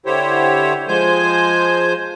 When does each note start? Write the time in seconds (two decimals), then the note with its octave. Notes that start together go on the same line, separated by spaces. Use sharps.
0.06 D3 E4 G4 C5 C#5
0.88 F3 G#3 C5 G#5 G6